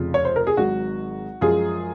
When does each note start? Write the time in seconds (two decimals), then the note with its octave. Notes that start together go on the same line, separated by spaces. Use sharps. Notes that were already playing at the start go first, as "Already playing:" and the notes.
Already playing: F1 F2 C#3 F3 F4
0.14 C#5
0.25 C5
0.36 A#4
0.47 G#4
0.57 G#1 G#2 F#3 F#4
1.41 F#2 F3 G#3 F4 G#4